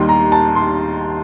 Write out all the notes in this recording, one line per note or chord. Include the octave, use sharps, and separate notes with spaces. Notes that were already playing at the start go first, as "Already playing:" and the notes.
Already playing: D#2 D#3 G3 C6
A#5
A5
C6